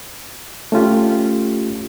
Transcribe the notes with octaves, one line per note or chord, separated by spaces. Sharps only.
A3 C#4 F4 G4